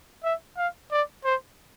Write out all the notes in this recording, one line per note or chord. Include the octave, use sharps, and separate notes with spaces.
E5
F5
D5
C5